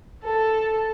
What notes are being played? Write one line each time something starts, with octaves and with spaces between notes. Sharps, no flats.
A4